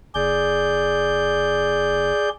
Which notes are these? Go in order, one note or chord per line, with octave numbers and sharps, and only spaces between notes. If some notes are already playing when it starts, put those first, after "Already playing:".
F#1 G#4 D5 G6